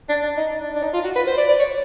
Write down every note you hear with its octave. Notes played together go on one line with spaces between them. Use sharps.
D4
D4
D#4
D4
D4
D#4
F4
F#4
B4
C5
D5
D5
C#5